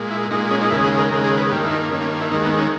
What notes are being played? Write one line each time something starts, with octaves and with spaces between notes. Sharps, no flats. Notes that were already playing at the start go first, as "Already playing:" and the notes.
Already playing: A#2 G#3
E4
A#2 G#3 D#4
C#4
D#4
D#2 C#3 G#3 E4
G#4
A#4
D#2 C#3 G#3 A#4
G#4
B4
G2 D#3 A#3 G4
E4
D#4
G2 D#3 A#3 C#4
C#4
E4
D#2 D#3 G#3 D#4
B3
C#4